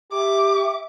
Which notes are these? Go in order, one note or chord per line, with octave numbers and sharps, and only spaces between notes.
G4 E5 D6